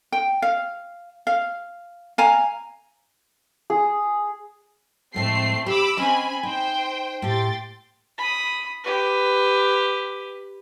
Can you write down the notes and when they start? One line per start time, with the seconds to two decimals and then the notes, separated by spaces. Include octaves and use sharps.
0.12 G5
0.42 F5
1.27 F5
2.18 F5 G#5 A#5
3.70 G#4
5.14 F2 A2 G#3 A3 C4 C7
5.66 G4 B5 D6 E6
5.97 C4 C#4 C5 D#5 G#5 B5
6.43 D#4 C5 G5
7.22 A2 G4 G5 C6 A6
8.18 B5 D#6
8.84 G4 B4